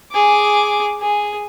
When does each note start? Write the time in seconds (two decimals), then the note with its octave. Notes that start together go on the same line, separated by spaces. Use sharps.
0.12 G#4 D6
1.01 G#4